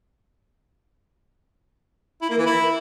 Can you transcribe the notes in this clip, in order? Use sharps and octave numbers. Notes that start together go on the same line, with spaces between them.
E4
A#3
E3
E4